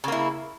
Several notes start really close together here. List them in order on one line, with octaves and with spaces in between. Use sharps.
C#3 A#3 E4